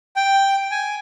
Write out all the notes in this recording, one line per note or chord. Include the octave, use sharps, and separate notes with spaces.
G5
G#5